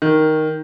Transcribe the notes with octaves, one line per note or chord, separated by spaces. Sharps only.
D#3